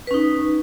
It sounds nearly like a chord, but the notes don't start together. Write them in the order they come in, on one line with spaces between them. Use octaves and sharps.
B4 C#4 D#4